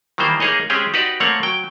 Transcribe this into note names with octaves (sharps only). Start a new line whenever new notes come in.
D#3 E3 G3 A#3 C5
A#3 D#4 G#4 C#5 D#5
G#3 C4 C#4 G4 G#4
D#4 F#4 G4 B4 D5
A3 A#3 C4 C#5 F#5
F#3 G5